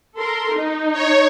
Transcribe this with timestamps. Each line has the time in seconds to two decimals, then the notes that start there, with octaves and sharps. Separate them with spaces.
0.17 A4 A#4 C6
0.54 D#4
0.92 C#5